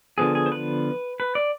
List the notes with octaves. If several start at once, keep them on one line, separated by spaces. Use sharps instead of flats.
D3 F3 B3 G#4
G#4
C5
B4
B4
D5